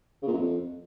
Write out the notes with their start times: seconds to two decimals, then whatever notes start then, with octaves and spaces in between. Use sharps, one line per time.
0.22 C#3
0.27 A#2
0.32 F#2
0.38 F2